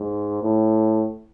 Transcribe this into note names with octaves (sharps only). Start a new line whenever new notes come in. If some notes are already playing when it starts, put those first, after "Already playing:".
Already playing: G#2
A2